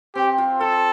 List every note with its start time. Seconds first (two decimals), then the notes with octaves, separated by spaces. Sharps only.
0.15 C4 G4
0.38 F4
0.60 F4 A4